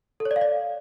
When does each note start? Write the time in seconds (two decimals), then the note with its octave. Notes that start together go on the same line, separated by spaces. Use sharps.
0.20 A4
0.25 C#5
0.31 D5
0.36 F5
0.41 D5